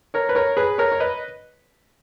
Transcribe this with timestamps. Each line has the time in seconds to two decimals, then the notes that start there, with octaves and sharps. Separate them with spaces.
0.14 A#4 C#5
0.29 B4
0.35 A#4 C#5
0.57 G#4 B4
0.78 A#4 C#5
0.92 C#5
1.00 B4 D#5